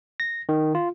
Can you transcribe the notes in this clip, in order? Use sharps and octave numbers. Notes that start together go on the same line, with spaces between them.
A#6
D#3
F4